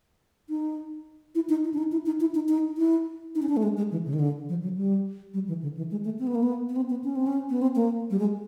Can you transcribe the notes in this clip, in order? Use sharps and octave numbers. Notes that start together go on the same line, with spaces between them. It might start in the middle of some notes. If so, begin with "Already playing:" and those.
D#4
E4
D#4
E4
D4
D#4
E4
D#4
E4
D#4
D#4
E4
D#4
C#4
D4
A3
G#3
G#3
E3
C#3
D#3
D3
F3
F#3
G3
G3
E3
D3
E3
G#3
A3
C4
B3
A#3
B3
B3
C4
B3
C#4
C4
C#4
B3
C4
A#3
G3
G#3